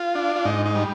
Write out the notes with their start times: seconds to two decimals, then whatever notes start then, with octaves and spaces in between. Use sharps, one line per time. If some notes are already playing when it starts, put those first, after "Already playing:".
Already playing: F4
0.15 D4
0.36 F4
0.45 G#2 D#4
0.66 D#4
0.76 G3